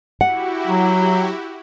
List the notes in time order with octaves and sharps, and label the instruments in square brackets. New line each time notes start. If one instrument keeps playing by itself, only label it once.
[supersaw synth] E4 F#4 G4 [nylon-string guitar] F#5
[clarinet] F#3